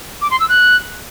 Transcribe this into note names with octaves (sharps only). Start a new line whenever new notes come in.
D6
C6
E6
F#6